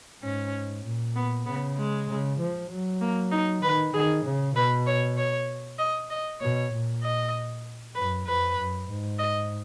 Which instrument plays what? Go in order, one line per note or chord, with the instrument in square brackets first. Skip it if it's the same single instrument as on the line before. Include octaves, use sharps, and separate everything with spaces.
[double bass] G#2 [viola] C#4
[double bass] A#2
[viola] B3
[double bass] C#3 [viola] B3
[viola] G#3
[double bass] C#3
F3
F#3
[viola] A#3
D#4
[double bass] D#3 [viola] B4
[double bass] D#3 [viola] G#4
[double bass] C#3
[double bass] B2 [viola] B4
[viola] C#5
C#5
D#5
D#5
[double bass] B2 [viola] C#5
[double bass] A#2
[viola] D#5
[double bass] F#2 [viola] B4
[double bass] F2 [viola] B4
[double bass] F#2
G#2
[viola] D#5